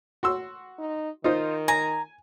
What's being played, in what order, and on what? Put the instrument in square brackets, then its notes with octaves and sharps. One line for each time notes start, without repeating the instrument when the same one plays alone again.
[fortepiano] F#4 C6 E6
[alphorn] D#4
[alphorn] D#3 [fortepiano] D#4 F4 C5
[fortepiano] G#5 [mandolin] A#5